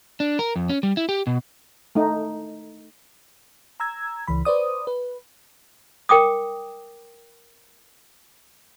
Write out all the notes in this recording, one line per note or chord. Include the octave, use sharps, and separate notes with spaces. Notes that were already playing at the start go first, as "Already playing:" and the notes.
D4
A#4
F2
C#4
G3
E4
G4
B2
A3 D#4
A#5 E6 G#6
C#2 E3 B5
B4 C5 D5 D#6
B4
A#4 G5 D6 D#6